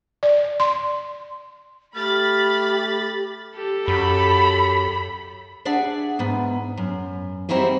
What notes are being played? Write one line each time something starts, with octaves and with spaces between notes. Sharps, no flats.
D5
C6
A3 G4 B5 F6 A6
G4 A4
F#2 B5
D4 G#4 D5 E5 F#5
E2 G#2 B3
F#2
G3 C4 D#4 E4 F#4 G#4